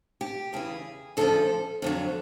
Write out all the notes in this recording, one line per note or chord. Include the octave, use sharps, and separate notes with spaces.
G4
E2 C#3 E3 G#4
D2 C#3 F3 A4
F2 D3 F#3